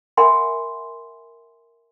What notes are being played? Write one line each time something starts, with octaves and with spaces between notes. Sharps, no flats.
A#4 E5 F#5 G#5 B5 C6